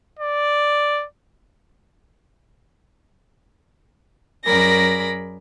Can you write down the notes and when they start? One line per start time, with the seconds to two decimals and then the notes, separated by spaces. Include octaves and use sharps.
0.19 D5
4.46 F#2 G#4 A#4 D5 B5 A#6